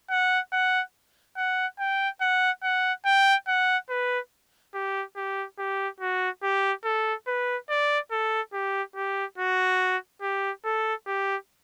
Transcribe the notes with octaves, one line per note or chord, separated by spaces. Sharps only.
F#5
F#5
F#5
G5
F#5
F#5
G5
F#5
B4
G4
G4
G4
F#4
G4
A4
B4
D5
A4
G4
G4
F#4
G4
A4
G4